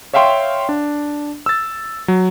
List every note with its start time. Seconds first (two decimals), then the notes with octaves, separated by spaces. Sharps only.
0.14 C#5 E5 F5 G5 C6 C#6
0.69 D4
1.46 E6 A6
2.08 F#3